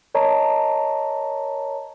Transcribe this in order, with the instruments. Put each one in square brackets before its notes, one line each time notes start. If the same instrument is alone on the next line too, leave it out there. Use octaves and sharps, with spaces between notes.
[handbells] A#4 C#5 D#5 A5 A#5